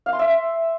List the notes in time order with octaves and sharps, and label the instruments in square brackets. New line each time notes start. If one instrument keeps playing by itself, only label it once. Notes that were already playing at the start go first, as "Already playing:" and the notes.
[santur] F5
C6
E5